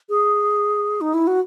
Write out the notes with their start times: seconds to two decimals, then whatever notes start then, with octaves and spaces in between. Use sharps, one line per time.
0.09 G#4
1.01 D#4
1.14 E4
1.27 F#4